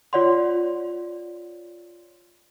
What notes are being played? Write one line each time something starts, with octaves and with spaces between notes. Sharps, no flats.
F4 C#5 D5 F#5 C6